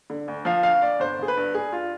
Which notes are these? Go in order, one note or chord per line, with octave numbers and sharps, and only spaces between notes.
D3
D2
F3 F5
D2 F5
D2 D5
G1 C5
G1 G#4
B4
G2
G2 G#4
F4